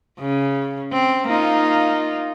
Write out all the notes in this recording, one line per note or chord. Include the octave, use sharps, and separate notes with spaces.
C#3
C4
A#3 D#4 F4